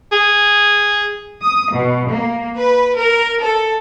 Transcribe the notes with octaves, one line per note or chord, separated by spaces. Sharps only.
G#4
D#6
B2
A#3
B4
A#4
A4